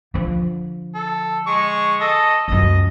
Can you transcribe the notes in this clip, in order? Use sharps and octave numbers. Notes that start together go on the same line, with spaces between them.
D3 F3
A4
G#3 C#6
A4 D#5
C#2 F#2 D#5